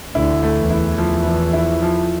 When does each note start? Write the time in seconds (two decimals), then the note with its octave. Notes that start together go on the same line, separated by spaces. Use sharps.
0.15 D2 D3 E4
0.43 A3
0.56 E2 E3
0.70 E4
0.98 F3
1.27 F3
1.53 E4
1.82 F3